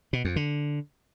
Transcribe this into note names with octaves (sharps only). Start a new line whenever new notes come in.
B2
F2
D3